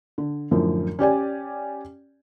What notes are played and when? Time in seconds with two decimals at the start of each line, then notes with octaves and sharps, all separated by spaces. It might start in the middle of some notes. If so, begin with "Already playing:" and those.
0.18 D3
0.51 F#2 A2 D3 F3
0.99 C#4 G4 D5 G#5